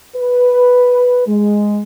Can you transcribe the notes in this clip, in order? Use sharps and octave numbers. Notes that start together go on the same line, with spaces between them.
B4
G#3